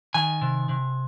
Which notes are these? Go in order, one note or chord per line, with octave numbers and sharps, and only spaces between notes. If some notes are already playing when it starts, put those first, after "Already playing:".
D#3 G#5
C3
C3